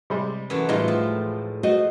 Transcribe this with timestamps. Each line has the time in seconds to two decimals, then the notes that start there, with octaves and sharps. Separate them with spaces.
0.10 C3 G3 G#3
0.50 F#2 E3 A3
0.69 D2 A2 G3 G#3 D#4 F4
0.88 F3
1.63 A3 F#4 C5 D#5